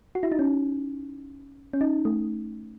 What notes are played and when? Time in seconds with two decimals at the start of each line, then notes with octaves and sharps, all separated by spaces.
0.15 F#4
0.23 E4
0.32 D#4
0.39 C#4
1.73 C#4
1.81 D#4
2.05 A3